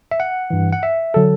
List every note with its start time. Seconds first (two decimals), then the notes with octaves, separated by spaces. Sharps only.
0.11 E5
0.20 F#5
0.50 G2 E3
0.72 F#5
0.83 E5
1.14 D3 F#3 A4